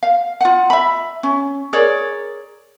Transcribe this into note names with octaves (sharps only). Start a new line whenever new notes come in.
F5
F4 F#5
E5 B5
C#4
G#4 A#4 C#5 D5